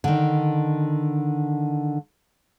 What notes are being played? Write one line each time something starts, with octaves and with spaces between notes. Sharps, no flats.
D3 D#3